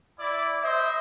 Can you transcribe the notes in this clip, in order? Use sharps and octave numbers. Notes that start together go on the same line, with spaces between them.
E4 D5
C5 D#5 E5